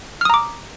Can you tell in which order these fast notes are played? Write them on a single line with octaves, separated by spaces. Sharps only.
F6 D#6 A#5 D6